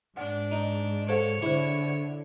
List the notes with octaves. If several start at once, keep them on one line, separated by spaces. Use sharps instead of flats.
G#2 D4 F#5
D#4
A4 C5 C#5 F5 F#5
D3 E4 G#4 C5